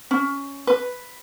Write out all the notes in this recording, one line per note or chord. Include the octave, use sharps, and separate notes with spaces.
C#4
B4